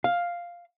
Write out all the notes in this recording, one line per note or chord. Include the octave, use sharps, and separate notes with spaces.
F5